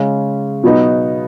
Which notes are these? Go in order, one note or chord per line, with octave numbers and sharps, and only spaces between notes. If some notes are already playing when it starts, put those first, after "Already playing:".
Already playing: C#3 G#3 C#4
B2 F#3 B3 D#4 F#4